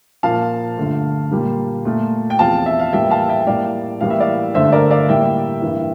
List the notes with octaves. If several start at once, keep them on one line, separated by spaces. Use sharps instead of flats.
A#2 F3 A#3 F5 A5
G2 D3 A3
A#2 G3 A#3
A#2 A3
G5
E2 C3 F3 F5 A5
E5
F5
A2 E3 G3 A#3 E5 G5
F5 A5
E5 G5
A2 G3 A#3 D5 F5
A2 E3 G3 A#3 F5
E5
D5 F5
G2 D3 A3 C5 E5
A#4 D5
D5 F5
A2 G3 A#3 E5 G5
G2 E3 A#3